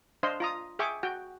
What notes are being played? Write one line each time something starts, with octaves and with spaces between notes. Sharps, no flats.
D4 C5 D#5 F5 C6
F4 A#5 D#6
G#4 E5 G5 C#6 D6
F#4 G5